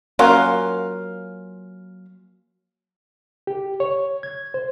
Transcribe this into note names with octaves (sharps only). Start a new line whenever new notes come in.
F#3 A#3 C#4 F4
G4
C#5
G#6
C5